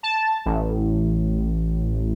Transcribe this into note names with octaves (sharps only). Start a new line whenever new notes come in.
A5
A1